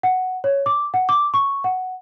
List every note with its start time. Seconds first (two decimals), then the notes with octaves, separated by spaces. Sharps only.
0.03 F#5
0.44 C#5
0.66 D6
0.94 F#5
1.09 D6
1.34 C#6
1.64 F#5